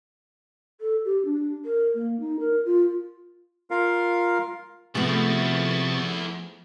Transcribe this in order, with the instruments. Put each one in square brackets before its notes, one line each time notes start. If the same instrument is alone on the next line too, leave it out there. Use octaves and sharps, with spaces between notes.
[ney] A4
G4
D4
A#4
A#3
D#4
A#4
F4
[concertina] F4 A#4 F5
[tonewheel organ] C3 C#6 A6 [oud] F3 A3 B3 [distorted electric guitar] E4 G#4